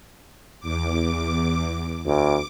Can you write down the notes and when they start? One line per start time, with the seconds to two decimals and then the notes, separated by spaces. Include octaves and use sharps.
0.60 E2 D6
2.06 D2 D6